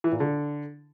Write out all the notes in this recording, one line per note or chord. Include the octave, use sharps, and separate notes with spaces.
E3
A#2
D3